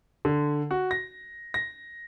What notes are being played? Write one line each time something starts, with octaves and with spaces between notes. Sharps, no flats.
D3
F#4
A#6
A#6